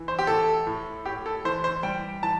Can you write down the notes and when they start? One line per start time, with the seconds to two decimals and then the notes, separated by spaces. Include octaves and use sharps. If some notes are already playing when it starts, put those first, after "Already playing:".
Already playing: E3
0.08 C5
0.19 G4
0.27 A2 A4
0.67 A2
1.06 A2 G4
1.26 A4
1.45 E3 C5
1.64 C5
1.83 G3 G5
2.22 E3 A5